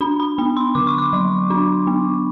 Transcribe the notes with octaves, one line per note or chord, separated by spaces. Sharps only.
D4 B5
B5
B3 B5
C6
D3 D6
C#6
D6
F#3
D4
B3